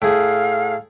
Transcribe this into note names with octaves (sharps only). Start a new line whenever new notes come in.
A2 G#4 F5